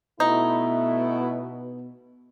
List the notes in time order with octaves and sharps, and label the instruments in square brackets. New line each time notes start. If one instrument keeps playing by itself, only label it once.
[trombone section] B2 B3 [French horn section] A3 E4 [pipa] D#4